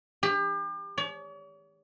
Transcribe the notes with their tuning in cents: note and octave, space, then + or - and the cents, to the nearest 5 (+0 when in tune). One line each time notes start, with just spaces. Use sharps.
G4 +35
C#5 +45